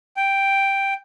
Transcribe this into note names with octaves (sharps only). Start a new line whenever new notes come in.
G5